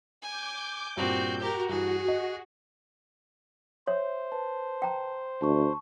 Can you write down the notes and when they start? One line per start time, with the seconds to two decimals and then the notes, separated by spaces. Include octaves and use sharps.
0.22 G#5 D6 G6
0.97 G2 A#2 C4 F#4 G6
1.40 F#4 G4 A#4
1.69 G2 E3 G#4
2.08 D#5
3.87 C5 C#5 E5
4.32 B4 A5
4.82 G5 A#5
5.42 D2 A5 C#6